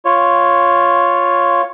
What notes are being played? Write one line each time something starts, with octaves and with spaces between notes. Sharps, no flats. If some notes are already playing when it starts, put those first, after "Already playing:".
F4 C#5